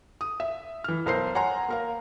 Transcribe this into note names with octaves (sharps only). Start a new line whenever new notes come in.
D#6
E5
E3 F6
B1 A#4 C5 C7
C#5 F#5 G#5 A#5 C6
A#3 A#4 F5